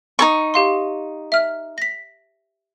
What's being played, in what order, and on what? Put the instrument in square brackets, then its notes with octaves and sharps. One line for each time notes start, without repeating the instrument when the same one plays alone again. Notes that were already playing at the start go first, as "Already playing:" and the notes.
[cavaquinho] D#4 A4 C#6
[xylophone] G4 F5 C6
E5 F6
A#6 B6